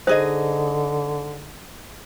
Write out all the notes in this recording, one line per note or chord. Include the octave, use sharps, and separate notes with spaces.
D3 D#4 G#4 C5 D#5